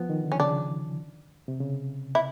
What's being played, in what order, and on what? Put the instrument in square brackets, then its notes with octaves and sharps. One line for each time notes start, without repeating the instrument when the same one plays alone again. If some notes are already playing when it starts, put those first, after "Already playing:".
Already playing: [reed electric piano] F3 [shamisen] B3
[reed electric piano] D#3
D3
[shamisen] C#4
[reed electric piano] C#3 [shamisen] D4
[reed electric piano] C3
C#3
[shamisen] E4